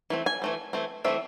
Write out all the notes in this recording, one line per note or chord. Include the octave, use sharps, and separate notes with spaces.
E3 A3 C4
G#5
E3 A3 C4
E3 A3 C4
E3 A3 C4 E5